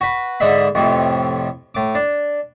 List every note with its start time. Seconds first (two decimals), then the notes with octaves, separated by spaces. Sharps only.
0.01 F#4 B4
0.40 G#2 D3 D#5 E5 B5
0.75 F2 A2 C3
1.75 A2 D6
1.95 D4